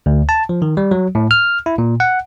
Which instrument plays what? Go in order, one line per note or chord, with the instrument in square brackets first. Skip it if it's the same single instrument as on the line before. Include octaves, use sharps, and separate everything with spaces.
[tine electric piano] D2
A5
F3
D#3
G3
F#3
A2
F6
E4
A#2
F#5